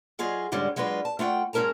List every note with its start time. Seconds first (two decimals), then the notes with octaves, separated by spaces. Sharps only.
0.19 F#3 F4 G#4 D#5
0.52 G#2 D3 G3 G#3 C#4 D#4
0.76 F#3 G#3 D4 F4 B4
1.05 A5
1.19 A3 F4 F#5 G5
1.53 G#2 G#3 C#4 A#4 A5 A#5